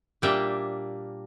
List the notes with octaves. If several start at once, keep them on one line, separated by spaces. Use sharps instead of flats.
A#2 G3 A#3 D4 E5 G5